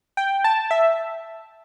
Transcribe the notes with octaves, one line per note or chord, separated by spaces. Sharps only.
G5
A5
E5